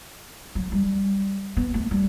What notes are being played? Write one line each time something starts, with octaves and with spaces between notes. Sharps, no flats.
F#3
G3
B3
A3
G3